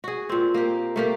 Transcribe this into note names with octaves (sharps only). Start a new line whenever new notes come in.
F#4 G#4
A#2 C4
A#3 G4
A3 A#3 G4